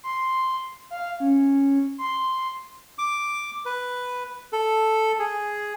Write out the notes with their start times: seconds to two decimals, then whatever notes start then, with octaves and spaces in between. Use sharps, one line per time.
0.03 C6
0.90 F5
1.20 C#4
1.98 C6
2.98 D6
3.65 B4
4.53 A4
5.19 G#4